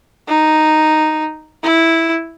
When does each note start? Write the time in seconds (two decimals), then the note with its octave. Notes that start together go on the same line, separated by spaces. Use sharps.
0.28 D#4
1.64 E4